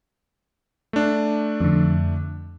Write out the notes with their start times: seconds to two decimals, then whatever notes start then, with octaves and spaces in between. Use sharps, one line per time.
0.93 A3 D4
1.61 F2 D3